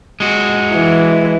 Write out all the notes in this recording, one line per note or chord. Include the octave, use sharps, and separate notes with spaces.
G#3 F#4
E3